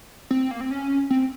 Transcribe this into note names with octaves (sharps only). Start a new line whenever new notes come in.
C4
A#3
C4
C#4
C4